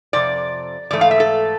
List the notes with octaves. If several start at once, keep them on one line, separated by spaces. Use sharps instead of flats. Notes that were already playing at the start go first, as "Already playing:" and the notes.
F2 C3 D5
G#2 E3 A3 D5
F5
E5
A4